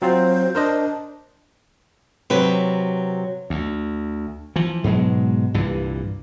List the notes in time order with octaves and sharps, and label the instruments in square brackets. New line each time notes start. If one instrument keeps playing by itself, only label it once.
[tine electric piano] F#3 C4 F4 [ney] C5
[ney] D4 [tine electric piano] A#4 C5 D#5
[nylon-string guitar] C3 F#3 B4
[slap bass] D2
E3 F3
G#2 B2 F#3 G#3
C2 G2 A#2 E3